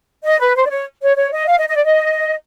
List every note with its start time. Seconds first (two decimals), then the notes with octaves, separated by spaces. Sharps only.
0.24 D#5
0.39 B4
0.55 C5
0.66 D5
0.70 C#5
1.01 C#5
1.16 C#5
1.32 D#5
1.47 F5
1.58 D#5
1.68 D#5
1.76 D5
1.84 D#5